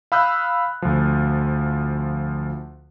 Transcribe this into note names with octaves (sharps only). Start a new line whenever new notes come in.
F5 B5 D#6 E6 F#6 G6
D2 F3